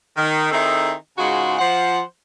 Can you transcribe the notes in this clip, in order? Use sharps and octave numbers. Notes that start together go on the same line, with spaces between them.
D#3
D#3 C4 D#4 E4 G#4 A4
G#2 C#3 G#3 F4 F#4
F3 C5 F#5